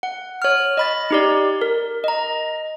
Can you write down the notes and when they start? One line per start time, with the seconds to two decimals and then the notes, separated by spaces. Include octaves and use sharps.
0.03 F#5
0.42 C#5 F6
0.77 D#5 B5 A6
1.11 D#4 G4 D5
1.61 A#4
2.04 D#5 A#5